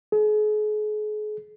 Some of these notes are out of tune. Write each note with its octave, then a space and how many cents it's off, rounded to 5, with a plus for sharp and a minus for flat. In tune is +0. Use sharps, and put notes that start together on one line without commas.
G#4 +40